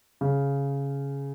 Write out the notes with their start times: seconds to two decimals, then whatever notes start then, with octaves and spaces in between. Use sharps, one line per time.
0.21 C#3